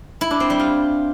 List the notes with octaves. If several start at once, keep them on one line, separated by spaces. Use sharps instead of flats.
E4
D4
C4
G3
F4